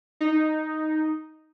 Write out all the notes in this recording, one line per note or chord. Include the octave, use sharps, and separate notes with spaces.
D#4